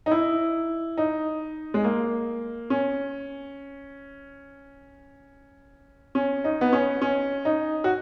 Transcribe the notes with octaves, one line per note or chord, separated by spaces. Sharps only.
D#4
E4
D#4
G#3
A#3
C#4
C#4
D#4
B3
C#4
C#4
D#4
F#4